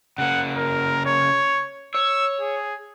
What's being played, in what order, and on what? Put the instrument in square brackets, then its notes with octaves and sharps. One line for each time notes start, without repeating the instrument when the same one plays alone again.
[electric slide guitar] C#3 A#3 [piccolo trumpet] F#5
[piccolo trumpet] A#4
C#5
[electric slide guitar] C#5 [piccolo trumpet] E6
[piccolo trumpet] G#4